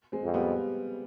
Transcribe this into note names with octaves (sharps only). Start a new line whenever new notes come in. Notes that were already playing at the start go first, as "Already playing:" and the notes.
G#3 C4
F2
G3 B3